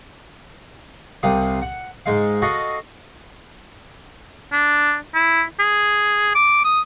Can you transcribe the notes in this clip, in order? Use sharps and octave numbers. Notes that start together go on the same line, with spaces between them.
C2 C3 F5 D#6
F#5
G#2 G#3 F5
F#4 A4 D#5 F5
D4
E4
G#4
D6
D#6